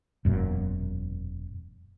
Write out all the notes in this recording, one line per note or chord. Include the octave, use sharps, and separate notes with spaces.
E1 F#2 A#2